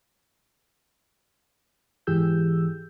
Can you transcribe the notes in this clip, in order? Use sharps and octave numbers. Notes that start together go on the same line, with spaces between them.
G#2 E3 G4 G#4 E6 G6